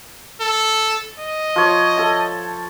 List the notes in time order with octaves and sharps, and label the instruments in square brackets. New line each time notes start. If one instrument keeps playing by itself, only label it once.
[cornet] A4
D#5
[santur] F3 C#5
A4 A5